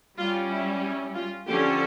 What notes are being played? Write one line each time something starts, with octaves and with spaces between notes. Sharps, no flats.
G3 C#4 F4
E4
E4
F4
D3 F3 C#4 G4